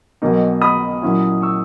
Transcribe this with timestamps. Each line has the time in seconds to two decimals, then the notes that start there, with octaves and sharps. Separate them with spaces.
0.22 B1 B2 A#3 D#4
0.62 B5 D#6
1.02 A#2 F#3 C#4 E4
1.42 C#6 E6